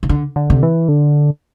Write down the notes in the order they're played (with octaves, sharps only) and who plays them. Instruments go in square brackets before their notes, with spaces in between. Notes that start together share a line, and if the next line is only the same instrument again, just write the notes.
[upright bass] C3
D3
[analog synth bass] D3
[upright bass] C3
[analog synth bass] E3
D3